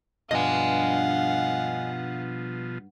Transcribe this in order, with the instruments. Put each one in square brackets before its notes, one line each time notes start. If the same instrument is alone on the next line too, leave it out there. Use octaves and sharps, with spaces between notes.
[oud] G2 D4 [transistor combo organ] B2 F3 [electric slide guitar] D#5 G#5 [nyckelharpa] F5 F#5